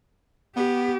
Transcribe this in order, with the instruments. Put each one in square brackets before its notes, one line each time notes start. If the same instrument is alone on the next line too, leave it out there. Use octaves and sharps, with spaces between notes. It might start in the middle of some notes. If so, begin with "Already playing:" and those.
[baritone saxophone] B3 [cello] G4